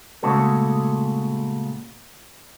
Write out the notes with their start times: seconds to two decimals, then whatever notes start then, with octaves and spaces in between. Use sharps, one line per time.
0.23 A#2 C#3 G#3 A3 F#4 A4